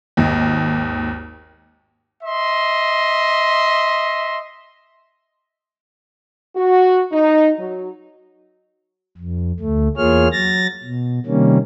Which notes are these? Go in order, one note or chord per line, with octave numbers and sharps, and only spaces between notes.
G#1 D#2
D#5 E5 C6
F#4
D#4
F#3
F2
D2 A3
E2 A#3 F4 G#4 C#5 F6
F#3 A6 A#6
B2
C3 D#3 G3 A#3 C#4